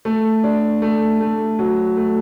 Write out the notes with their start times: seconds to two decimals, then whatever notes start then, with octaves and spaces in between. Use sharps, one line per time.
0.05 A3
0.44 D4
0.82 A3
1.20 A3
1.59 F#3
1.97 A3